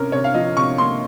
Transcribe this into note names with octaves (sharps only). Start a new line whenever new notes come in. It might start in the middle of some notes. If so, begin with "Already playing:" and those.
Already playing: C3 C#4 A#4
C3 C#5
F5
F3 D#5
C3 C#6
A#3 C6